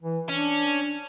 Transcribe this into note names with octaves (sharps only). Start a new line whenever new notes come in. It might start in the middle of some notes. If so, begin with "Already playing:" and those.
E3
C#4 D4